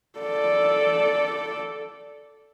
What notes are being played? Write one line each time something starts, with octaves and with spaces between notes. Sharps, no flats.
A4 D5